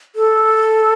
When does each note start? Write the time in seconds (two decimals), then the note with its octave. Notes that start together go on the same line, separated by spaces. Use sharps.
0.16 A4